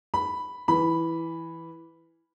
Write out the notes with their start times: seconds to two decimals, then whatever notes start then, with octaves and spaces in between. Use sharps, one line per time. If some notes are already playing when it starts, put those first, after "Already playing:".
0.14 B5
0.68 E3 B5